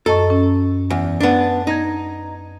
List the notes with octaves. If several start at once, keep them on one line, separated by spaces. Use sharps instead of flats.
F#2 A4 D#5 C#6
C#4
E2
B3 D4
D#4 G#6 A#6